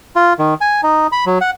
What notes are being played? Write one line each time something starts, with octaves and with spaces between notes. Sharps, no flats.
F4
D#3
G#5
D#4
B5
F#3
F#5